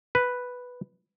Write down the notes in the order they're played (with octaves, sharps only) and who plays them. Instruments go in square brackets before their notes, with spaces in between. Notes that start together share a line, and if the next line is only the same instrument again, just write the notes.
[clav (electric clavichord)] B4